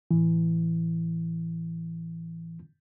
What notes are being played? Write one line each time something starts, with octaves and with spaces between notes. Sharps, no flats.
A2 E3